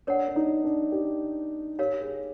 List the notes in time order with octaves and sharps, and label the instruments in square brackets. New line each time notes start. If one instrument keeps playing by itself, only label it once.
[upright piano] D4 [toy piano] A#4 C#5 F#5
[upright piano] D4
D#4
D4
G4
[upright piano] G4 [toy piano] A#4 C#5 F5
[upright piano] G#4